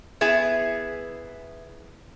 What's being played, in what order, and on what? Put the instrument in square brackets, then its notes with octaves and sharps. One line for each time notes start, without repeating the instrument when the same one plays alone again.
[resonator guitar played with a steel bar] B3 E4 G#4